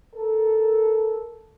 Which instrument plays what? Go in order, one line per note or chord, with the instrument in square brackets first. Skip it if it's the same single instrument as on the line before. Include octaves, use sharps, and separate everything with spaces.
[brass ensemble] A4 A#4